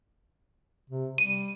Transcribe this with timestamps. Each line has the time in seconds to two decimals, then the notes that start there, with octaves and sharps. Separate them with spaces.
0.90 C3
1.18 G3 D#7